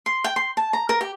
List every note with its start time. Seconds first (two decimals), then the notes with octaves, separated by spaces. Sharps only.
0.06 C6
0.24 G5
0.36 C6
0.57 A5
0.73 A#5
0.89 A#4
1.01 G4